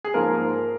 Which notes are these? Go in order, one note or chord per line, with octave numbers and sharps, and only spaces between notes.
G#4
G#2 F3 A#3 A#4